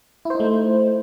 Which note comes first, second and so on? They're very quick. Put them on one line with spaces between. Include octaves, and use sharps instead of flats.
E4 C5 D#4 A3